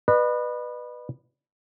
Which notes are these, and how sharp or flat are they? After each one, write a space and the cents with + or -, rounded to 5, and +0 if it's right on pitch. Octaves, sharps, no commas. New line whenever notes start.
B4 -5 D#5 -45